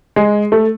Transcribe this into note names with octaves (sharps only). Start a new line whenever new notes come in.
G#3
A3